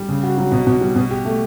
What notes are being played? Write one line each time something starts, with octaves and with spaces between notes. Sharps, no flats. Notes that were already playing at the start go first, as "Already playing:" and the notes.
Already playing: G3
C#3
F#4
F#3
B2
B2
G3
B2
G4
A3